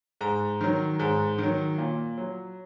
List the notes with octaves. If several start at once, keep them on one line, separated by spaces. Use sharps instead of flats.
G#2 A#5
D#3 F#3
G#2
D#3 F#3
A#2
F#3